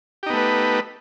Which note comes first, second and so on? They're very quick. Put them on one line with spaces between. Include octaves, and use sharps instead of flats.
G4 D#4 B3 A3 B4